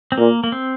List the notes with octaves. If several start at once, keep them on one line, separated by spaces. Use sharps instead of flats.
C4
A#2 A#3
A#3
C4